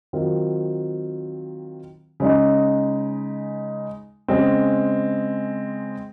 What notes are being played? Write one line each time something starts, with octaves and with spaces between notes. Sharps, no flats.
D#3 F#3 C4 F4
C#3 G#3 D#4
C#3 G#3 C4